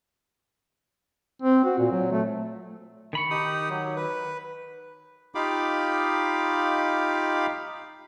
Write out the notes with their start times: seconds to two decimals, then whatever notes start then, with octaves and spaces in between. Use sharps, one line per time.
1.42 C4
1.64 F#4
1.78 A#2
1.92 F#3
2.12 A3
3.13 D#3 B5 C#6
3.31 D#4 G4 D#6
3.70 F#3
3.97 B4
5.35 D#4 F4 G4 F5 B5 D6